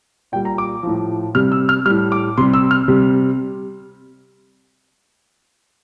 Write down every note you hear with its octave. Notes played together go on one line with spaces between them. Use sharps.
A#2 G3 G5
A#5
D6
A2 F3
C3 G3 F6
E6
F6
A2 G3 F6
D6
C3 G3 C6
E6
F6
C3 G3